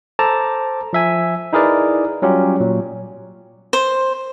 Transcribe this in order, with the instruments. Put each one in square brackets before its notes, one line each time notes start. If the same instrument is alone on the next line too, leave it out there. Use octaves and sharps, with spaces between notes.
[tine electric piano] A4 C5 A5 A#5 D6
F3 E5 G#5
D#4 E4 G#4 A#4 B4 D5
F#3 G3 C#4 F4 G4
A#2 F#3
[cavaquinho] C5